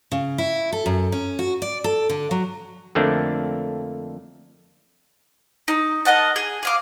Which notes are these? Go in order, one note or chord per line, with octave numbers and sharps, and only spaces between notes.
C#3
E4
A4
F#2
C#4
F#4
D5
A4
D3
F#3
F2 D3 A3 A#3 C4 D4
D#4
A#4 D#5 F#5 A5
G#4
G#4 F5 D6